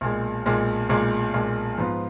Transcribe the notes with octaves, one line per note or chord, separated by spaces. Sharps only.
B1 A#2 G#3
B1 A#2 G#3
B1 A#2 G#3
B1 A#2 G#3
G#2 F3 B3 F4